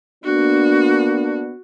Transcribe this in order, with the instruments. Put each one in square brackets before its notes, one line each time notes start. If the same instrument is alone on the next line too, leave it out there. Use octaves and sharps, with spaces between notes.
[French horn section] A#3 B3 D4 [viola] F#4